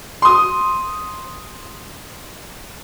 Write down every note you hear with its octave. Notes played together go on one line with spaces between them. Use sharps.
C6 D#6